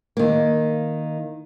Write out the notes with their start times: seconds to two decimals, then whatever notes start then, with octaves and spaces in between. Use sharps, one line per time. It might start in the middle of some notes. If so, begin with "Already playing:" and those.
0.17 D#3 A#3